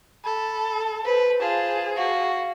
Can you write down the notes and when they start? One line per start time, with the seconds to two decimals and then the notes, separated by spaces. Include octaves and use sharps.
0.24 A4 B5
1.05 B4 C5
1.40 F4 G#4 A5
1.96 F#4 F5